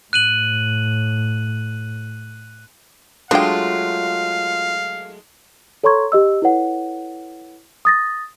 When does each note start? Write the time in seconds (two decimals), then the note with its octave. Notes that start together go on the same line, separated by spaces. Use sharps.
0.13 A2 F#6 D#7 F#7
3.31 F#3 G#3 A3 D4 F4 F5 G5
5.83 A4 C#5 A#5 C6 C#6 G#6
6.12 G4 D#5 E6
6.42 E4 A4 B4 C#5 F#5
7.85 D#6 A6 A#6